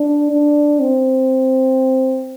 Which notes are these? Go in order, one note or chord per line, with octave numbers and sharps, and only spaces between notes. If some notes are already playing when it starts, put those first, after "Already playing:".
Already playing: D4
D4
C4